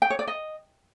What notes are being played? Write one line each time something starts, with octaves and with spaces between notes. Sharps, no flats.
G5
C#5
D5
D#5